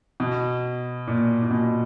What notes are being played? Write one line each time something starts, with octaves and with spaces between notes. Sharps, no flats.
B2
A#2
A#2
B2